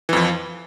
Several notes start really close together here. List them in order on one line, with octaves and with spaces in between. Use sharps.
E3 F2 F3